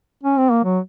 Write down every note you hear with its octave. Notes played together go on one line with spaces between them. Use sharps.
C#4
C4
A#3
F#3